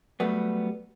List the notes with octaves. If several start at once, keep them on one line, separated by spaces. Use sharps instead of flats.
F#3 G3 A3 B3